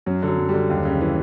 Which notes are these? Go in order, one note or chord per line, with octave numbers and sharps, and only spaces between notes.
F#2 F#3
D3
F#3
F#2
G3
D3
D#2
C#3
E3